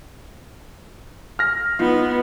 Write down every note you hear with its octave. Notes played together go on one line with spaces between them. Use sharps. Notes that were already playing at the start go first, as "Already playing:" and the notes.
F6 A#6
B3 D#4 F4